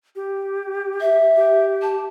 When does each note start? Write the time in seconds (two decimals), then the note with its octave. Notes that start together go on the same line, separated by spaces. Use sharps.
0.16 G4
1.01 E5
1.36 G4
1.82 A5